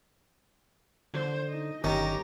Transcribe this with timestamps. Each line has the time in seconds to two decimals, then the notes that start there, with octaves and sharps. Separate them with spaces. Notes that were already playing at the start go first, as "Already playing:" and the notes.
1.14 D3 C5
1.48 D#4 D#5
1.84 G1 D#3 C#4 G4 A#5